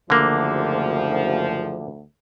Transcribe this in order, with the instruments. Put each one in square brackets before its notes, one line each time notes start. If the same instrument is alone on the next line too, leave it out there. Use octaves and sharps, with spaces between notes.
[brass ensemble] F#1 F3 [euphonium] D2 [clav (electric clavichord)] D3 A#3